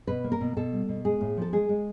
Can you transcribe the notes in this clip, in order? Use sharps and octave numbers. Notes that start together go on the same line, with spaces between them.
B2 B4
A#3
A#4
B2
B2 A4
G3
B2
G#3 G#4
A2
F3 A4
G#3 G#4
G#3